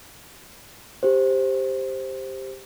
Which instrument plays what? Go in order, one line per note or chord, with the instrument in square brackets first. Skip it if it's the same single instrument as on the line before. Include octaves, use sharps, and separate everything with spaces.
[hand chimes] G4 G#4 C5